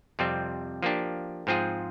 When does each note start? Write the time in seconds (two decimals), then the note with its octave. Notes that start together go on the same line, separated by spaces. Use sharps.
0.19 F2 C3 G3 C4
0.83 F3 A#3 D4 G4
1.47 G#2 F3 C4 F4 G#4